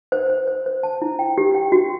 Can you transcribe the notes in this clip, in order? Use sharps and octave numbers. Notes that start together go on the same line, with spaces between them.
C5
C5
C5
C5
A5
E4
G5
G4
G5
F#4